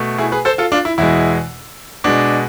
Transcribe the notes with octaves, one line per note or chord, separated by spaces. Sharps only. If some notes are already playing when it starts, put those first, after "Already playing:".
Already playing: B2 A3
E4 G#4
G#4 B4
A4 C5
F4 A4
D4 F4
E4
E2 B2 G#3 E4
B2 G#3 D4